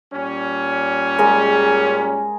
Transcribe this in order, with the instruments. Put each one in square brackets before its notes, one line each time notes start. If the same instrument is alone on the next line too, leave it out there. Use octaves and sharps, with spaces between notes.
[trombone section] A#2 G3 C#4
[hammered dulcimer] G#3 A#4 G#5